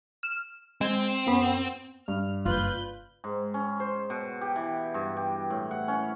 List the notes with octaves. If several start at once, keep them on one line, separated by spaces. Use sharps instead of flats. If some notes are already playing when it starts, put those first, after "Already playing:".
F6 E7
G#3 C4
F#2 B3
G2 F6
F#1 F4 B4 F#6 G6
G#2
C#4
C5
B2
G4
E3
G2
G4
A2
F#5
C#4